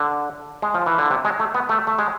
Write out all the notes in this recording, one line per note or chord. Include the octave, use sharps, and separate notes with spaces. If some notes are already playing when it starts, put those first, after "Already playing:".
Already playing: D3
G#3
F3
E3
D3
C3
G#3
A3
B3
A3
A3
G#3